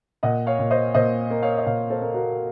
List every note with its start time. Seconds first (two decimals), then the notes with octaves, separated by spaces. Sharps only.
0.23 A#2 D#5 F#5
0.47 C#5 F5
0.59 A#2
0.71 C5 D#5
0.94 A#2 C5 D#5
1.30 A#3
1.42 C#5 F5
1.58 D#5
1.66 A#2 C#5 F5
1.90 A4 C5
2.02 A#3
2.14 F#4 A#4